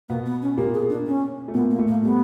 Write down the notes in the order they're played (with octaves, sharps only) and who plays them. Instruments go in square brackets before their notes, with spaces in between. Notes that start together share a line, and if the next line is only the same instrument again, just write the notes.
[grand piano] B2 B3 [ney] A#3
[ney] B3
C#4
[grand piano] A#2 A#3 [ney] G4
[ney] G#4
D4
C#4
[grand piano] A3
[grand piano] A#2 A#3 [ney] B3
[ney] A#3
[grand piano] A2 A3
[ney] A#3
[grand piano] G3 [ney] B3